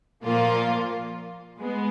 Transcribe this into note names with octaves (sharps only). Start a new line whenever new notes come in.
A#2 F3 A#3 F4
G#3 B3